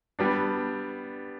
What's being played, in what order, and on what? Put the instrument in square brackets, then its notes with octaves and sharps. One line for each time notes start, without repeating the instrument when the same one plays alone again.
[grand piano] G3 B3 D4